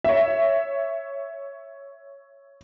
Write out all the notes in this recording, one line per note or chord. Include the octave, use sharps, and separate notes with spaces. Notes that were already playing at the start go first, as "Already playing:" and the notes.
C#5 E5